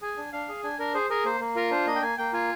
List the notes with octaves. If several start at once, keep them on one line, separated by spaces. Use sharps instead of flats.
G#4 G#5
D4
D4 F5
G#4
D4 G#5
D4 A#4
G#4 C5
G#4 A#4
A#3 C5
A#3
F4 A#4
D4 C5
A#3 D#5
G5
A#3 G#5
A#3 G5
F4 G#5